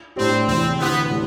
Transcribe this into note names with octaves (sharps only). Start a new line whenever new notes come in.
A2 G3 C4 D4 G4
E2 C3 E3 C4
D2 C3 E3 B3
A2 G3 D4